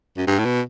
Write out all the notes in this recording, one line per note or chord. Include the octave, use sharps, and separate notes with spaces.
F#2
G2
A2
B2